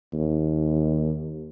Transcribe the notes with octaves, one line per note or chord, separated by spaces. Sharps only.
D#2